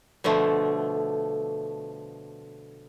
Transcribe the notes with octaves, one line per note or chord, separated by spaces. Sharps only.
B2 D3 F3 A3